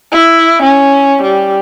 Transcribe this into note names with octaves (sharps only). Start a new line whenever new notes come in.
E4
C#4
G3